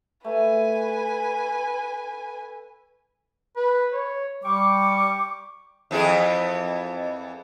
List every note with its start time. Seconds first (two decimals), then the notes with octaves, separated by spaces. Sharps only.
0.25 A3 B4 G#5
3.56 B4
3.93 C#5
4.44 G3 G5 C#6 D6
5.91 F2 E3 G#4